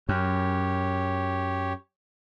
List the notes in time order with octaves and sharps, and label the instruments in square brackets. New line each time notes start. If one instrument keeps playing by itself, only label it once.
[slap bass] F#2 [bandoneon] G4 C#5